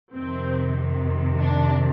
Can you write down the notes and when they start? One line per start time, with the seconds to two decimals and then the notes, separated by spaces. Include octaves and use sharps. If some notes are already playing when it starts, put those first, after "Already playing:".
0.13 F2 C3 D#3 C4
1.40 D4